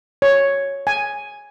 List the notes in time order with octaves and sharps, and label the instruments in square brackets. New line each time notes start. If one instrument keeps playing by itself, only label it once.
[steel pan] C#5
G#5